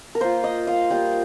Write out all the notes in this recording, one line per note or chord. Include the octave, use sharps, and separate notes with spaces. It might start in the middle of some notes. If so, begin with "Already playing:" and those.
A#4
A#3 F4 C5
D#5
F5
G3 A#3 F4 G5